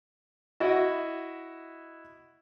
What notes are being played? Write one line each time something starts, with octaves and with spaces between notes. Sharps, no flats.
E4 F#4 D#5 E5